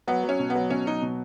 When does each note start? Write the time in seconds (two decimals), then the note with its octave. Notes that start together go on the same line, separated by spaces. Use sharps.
0.07 F#3 B3
0.23 F#3
0.29 C#4
0.40 B2
0.50 B3
0.55 F#3
0.70 B2 C#4
0.87 F#3 D#4
1.02 B2